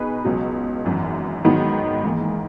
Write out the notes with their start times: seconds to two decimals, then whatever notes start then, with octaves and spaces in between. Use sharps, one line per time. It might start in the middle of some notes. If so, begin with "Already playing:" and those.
Already playing: B2 D#4 G#4 B4
0.25 C#2 B2 F#3
0.85 G#1 F#2 E3
1.45 G#2 D#3 F#3 B3 D#4
2.04 G#2 E3 A#3